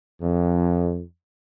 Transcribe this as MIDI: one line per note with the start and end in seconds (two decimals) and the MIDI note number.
0.21 1.01 41